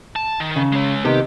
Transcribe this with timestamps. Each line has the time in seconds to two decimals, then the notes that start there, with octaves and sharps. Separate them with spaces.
0.16 A5
0.40 D#3
0.56 C#3
0.73 G#3 C#5
1.05 C3 D#3 B3 G4